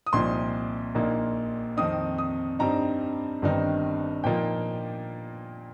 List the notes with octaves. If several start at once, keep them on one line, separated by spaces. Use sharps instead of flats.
D#6
C2 A#2 F3 C4 D#4 C6
A#1 A#2 A#3 D#4
F2 D#3 C4 D#4 D#6
D#6
G2 G3 C4 D#4 A#5
G1 G2 D#3 C4 D#4
A#2 F3 A#3 D#4 G5